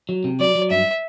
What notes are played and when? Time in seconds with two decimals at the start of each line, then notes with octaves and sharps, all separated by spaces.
0.09 F#3
0.24 C3
0.40 F#3 D5
0.55 F#3
0.71 G2 E5